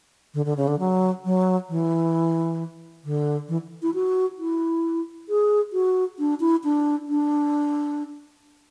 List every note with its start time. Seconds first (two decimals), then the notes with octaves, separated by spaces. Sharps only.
0.34 D3
0.46 D3
0.57 C#3
0.68 D3
0.79 F#3
1.25 F#3
1.69 E3
3.05 D3
3.48 E3
3.82 E4
3.94 F#4
4.38 E4
5.29 G#4
5.73 F#4
6.19 D4
6.40 E4
6.64 D4
7.09 D4